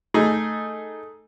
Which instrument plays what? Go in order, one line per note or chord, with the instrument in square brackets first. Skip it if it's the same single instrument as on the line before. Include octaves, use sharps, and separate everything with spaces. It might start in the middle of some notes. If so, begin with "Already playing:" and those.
[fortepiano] A3 D#4 G#4